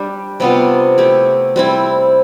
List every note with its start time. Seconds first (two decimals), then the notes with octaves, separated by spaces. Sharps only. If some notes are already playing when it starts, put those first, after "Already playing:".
Already playing: G3 D4 G4
0.40 C3 G3 B3 F4
0.98 A3 E4 G4
1.56 G3 C4 E4